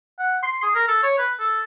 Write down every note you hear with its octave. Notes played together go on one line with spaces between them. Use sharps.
F#5
C6
G#4
A#4
A4
C#5
B4
A4